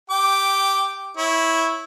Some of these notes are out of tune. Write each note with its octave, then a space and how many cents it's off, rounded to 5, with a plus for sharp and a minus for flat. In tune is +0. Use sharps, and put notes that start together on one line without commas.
G4 +0 G5 -10 D6 +0
E4 -10 C#5 -15